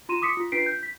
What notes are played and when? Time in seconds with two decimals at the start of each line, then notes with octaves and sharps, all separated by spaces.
0.09 F4 C6 D#7 E7
0.21 C6 D6 D#6 B6 C#7
0.37 F4
0.52 D4 F4 B4 B6 C7 D7
0.66 G6
0.83 B6